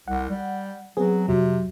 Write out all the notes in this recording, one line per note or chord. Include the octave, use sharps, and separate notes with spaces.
C2 F#5
G3
F#3 B3 C4 G#4
F2 C3 F#3